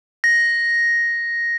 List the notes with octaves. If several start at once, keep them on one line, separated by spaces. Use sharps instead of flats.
A#6